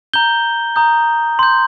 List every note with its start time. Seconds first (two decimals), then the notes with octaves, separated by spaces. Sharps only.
0.14 A#5 G6 G7
0.76 A#5 D#6 G6
1.39 C6 G6